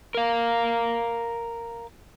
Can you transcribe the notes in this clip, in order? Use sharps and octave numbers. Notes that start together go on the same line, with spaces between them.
A#4 F5